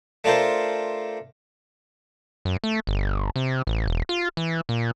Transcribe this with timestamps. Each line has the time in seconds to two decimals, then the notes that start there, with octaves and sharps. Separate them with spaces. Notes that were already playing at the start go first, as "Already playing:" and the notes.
0.24 A3 D4 F4 A4 A#4 C5
2.45 F#2
2.64 A3
2.87 G1
3.36 C3
3.67 A1
3.87 E1
4.09 F4
4.37 E3
4.69 A#2